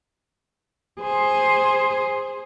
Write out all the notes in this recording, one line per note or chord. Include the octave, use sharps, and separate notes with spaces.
G#4 C5